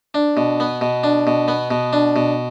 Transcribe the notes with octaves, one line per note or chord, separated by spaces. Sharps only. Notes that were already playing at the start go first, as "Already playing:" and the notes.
D4
B2
B3
B2
D4
B2
B3
B2
D4
B2